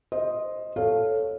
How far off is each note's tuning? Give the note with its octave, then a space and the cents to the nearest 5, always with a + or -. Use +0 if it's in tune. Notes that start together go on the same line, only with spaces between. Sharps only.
C5 +0 D#5 +0
A4 +0 C#5 +0 F5 +0